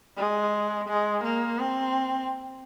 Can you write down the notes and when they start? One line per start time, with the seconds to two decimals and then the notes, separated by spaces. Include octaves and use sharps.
0.17 G#3
0.88 G#3
1.24 A#3
1.59 C4